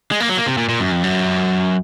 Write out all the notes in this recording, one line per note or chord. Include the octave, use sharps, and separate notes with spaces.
G#3
A#3
F#3
A#3
C3
A#2
A#2
F#2
F2
F#2